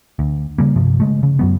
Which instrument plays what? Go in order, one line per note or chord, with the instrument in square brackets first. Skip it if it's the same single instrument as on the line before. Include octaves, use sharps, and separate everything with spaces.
[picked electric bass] D2
C#3 G3 A#3
G2 C3 F3
C#3 G#3 A3
C#3
F#2 F#3 B3